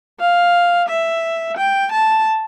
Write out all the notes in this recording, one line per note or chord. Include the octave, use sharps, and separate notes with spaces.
F5
E5
G5
A5